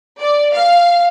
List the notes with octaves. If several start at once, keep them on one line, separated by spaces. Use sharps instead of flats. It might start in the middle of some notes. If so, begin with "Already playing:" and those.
D5
F5